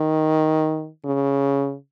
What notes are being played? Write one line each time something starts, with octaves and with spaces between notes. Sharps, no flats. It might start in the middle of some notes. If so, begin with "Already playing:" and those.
Already playing: D#3
C#3